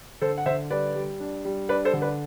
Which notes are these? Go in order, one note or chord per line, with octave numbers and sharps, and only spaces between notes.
D3 A4 C5
F#5
D3 C5 E5
G3 B4 D5
G3
D4
G3
D4 B4 D5
A4 C5
D3
B4 D5